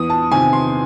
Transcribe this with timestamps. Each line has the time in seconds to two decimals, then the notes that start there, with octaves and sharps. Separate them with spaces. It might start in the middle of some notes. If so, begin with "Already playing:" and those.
Already playing: E2 D#6
0.10 A5
0.31 C3 D#3 G#5
0.53 C6